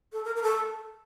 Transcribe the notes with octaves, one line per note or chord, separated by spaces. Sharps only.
A4
A#4
A#4
A4